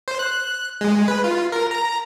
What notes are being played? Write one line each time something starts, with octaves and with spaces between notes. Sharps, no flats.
C5
F#6
G#3
B4
F4
A#4
A#5